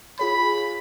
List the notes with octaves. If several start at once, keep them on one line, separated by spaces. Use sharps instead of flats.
F4 G#4 C#5 B5